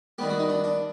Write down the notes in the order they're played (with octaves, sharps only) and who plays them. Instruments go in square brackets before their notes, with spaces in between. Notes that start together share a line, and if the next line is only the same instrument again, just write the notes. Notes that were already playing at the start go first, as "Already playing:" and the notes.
[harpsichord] D#3 G3 B3 G4
F#4
D#4
D4
D4